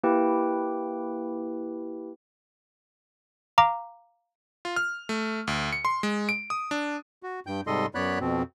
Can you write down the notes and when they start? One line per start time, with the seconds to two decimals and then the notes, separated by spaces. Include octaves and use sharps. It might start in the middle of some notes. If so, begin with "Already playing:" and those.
0.03 A#3 E4 G4 B4 G5
3.58 F5 A#5 D6
4.65 F4
4.76 F6
5.09 A3
5.47 D2
5.73 C#7
5.85 C6
6.03 G#3
6.29 D7
6.50 D#6
6.71 D4
7.23 F#4
7.47 G2 G5 G6
7.67 G#2 C3 G3 A4 D#5 C6
7.95 F#2 B3 C#5 D5 B5 F#6
8.21 F2 B2 C4